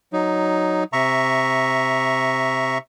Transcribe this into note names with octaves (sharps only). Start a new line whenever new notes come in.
F#3 D#4
C3 E5 A#5 C#6